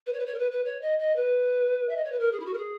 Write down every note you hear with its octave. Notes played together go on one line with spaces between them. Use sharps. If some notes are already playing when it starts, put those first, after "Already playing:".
B4
C#5
B4
C#5
A#4
B4
B4
C#5
D#5
D#5
B4
E5
D#5
C#5
B4
A#4
G#4
E4
F#4
A#4
G#4